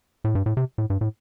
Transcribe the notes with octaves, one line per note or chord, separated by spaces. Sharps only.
A2
G2
A2
C3
A2
G2
A2